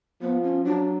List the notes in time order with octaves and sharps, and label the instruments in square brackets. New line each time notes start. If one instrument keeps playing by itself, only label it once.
[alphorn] F3 [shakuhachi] B3
[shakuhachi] C#4
[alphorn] F#3 [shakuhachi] D4